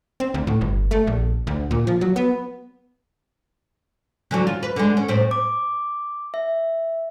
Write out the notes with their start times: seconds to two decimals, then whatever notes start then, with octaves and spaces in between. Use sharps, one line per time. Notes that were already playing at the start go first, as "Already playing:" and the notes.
0.20 C4
0.34 D2
0.47 A2
0.61 G1
0.91 A3
1.07 A#1
1.47 D2
1.71 A#2
1.87 F3
2.01 F#3
2.16 B3
4.31 D3 E3 F#3
4.47 F4
4.63 B4
4.76 D3 G#3
4.97 C#4
5.08 A2 C4
5.31 D6
6.34 E5